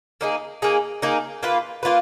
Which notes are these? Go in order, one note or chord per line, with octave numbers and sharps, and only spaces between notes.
A#3 D#4 G#4
A#3 D#4 G#4
A#3 D#4 G#4
A#3 F4 B4
A#3 F4 B4